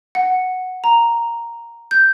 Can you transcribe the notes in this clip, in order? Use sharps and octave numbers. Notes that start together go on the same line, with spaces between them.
F#5
A#5
G6